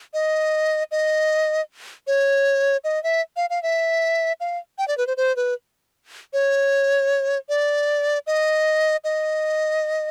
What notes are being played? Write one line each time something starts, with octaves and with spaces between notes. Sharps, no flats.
D#5
D#5
C#5
D#5
E5
F5
F5
E5
F5
G5
D5
B4
C5
C5
B4
C#5
D5
D#5
D#5